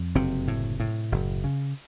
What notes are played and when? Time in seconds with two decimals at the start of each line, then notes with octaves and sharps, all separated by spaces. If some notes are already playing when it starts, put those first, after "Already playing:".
Already playing: F2
0.15 F#1 C3 C4
0.48 A2
0.80 A2
1.12 F#1
1.44 C#3